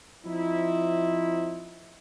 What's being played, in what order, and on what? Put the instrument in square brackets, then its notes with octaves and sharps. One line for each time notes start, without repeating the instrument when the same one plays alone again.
[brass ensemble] F3 C4 D#4 E4